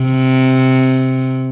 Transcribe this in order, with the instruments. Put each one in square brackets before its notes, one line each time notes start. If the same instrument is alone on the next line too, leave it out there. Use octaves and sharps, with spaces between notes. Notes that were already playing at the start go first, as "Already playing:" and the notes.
Already playing: [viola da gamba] C3